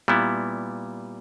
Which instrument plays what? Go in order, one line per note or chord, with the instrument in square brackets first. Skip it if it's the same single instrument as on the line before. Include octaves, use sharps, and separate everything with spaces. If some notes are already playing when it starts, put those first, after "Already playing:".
[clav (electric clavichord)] A#2 G3 B3 E4